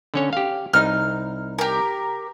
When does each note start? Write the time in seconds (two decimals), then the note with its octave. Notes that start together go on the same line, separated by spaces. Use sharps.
0.14 D3 C#4 C#5
0.33 G4 F5
0.73 C2 D#4 F6
1.58 G4 A#4